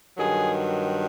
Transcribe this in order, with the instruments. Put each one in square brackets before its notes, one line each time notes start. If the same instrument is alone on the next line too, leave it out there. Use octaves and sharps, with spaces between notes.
[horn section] G2 D#3 F#3 G#4